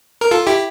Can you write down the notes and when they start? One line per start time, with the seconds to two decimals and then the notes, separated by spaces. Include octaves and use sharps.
0.21 A#4
0.31 F4 A4
0.47 E4 G4